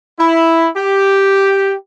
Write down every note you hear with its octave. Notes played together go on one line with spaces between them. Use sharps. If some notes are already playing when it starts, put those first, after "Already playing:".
E4
G4